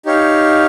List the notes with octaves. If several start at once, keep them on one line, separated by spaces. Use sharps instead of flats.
D#4 G4 C#5 F5